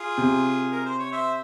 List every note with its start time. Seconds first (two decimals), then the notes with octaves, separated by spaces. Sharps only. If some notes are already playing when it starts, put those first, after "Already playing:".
Already playing: F4 G#4
0.18 C3
0.72 A#4
0.85 C5
0.99 C#5
1.12 C5 E5